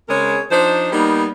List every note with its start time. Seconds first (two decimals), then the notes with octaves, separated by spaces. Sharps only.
0.09 C#3 G#3 C4 G#4 A#4 C#5
0.51 F3 D4 D#4 C5
0.93 G3 A#3 B3 D#4